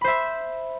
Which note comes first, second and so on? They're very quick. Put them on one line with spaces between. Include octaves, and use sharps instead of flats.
B5 C5 E5